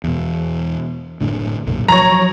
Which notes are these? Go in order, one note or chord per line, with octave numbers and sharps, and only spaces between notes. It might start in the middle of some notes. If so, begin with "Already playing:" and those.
E2 B2
F#1 A2 D3
B1 F#2 A#2
F3 F#3 C#5 A#5